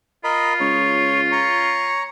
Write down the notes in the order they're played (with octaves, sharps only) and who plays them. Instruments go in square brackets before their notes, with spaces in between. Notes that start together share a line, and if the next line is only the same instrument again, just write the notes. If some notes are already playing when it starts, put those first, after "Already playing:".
[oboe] F4 [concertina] A#4 D#5 B5
[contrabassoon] C#2 [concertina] C#5
[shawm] C#5 [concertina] A#5